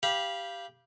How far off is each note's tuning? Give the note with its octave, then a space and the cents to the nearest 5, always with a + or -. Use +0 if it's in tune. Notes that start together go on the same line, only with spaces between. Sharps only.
G4 +0 F5 -15 B5 -25